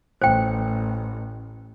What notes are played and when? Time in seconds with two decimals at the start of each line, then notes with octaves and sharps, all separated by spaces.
0.22 A1 C5 G5